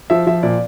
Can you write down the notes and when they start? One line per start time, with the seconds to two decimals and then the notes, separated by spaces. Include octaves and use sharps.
0.10 F3 E5
0.27 F3 E5
0.43 A#2 D5